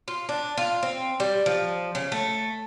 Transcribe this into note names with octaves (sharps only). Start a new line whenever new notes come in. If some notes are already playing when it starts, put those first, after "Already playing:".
F4
D4
F4
C4
G3
F3
C#3
A3